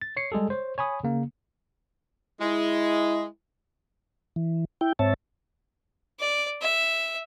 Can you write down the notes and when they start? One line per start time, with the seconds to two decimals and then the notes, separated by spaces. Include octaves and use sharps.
0.02 A6
0.17 C#5 C7 C#7
0.32 G3 G#3 G#4 A4
0.50 C5 C#5
0.78 C#5 G#5 B5 D#6
1.04 C#3 A#3
2.41 G#3 E4
4.36 E3
4.81 E4 G5
4.99 G#2 C4 C#5 E5 A5
6.19 D5
6.61 E5